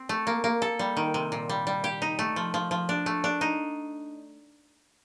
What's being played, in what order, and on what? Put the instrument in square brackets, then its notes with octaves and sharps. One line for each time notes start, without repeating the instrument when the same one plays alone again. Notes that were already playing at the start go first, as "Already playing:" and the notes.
Already playing: [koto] C4
A3
A#3
A#3
A4
G3
D#3
C3
A#2
G3
G3
G4
D#4
A3
F3
F3
F3
D4
A3
D4
D#4